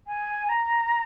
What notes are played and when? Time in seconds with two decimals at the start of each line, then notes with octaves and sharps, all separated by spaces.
0.07 G#5
0.49 A#5